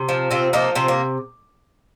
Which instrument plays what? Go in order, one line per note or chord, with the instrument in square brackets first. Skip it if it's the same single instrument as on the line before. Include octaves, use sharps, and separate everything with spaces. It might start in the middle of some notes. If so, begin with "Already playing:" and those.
Already playing: [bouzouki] C3
F3
C3 C4 F4
F3 A#3 D#4
C3 C4
A#3